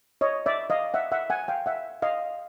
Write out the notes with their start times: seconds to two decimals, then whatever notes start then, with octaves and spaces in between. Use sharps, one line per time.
0.21 C#5 D#5
0.46 D5 E5
0.70 D#5 F5
0.94 E5 F#5
1.12 E5 F#5
1.30 F#5 G#5
1.48 F5 G5
1.66 E5 F#5
2.02 D#5 F5